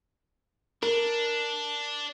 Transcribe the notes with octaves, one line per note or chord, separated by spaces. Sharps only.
D4 A#4